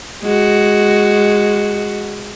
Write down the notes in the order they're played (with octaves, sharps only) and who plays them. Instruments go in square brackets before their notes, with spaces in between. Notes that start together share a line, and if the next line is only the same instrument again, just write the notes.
[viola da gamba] G#3 F#4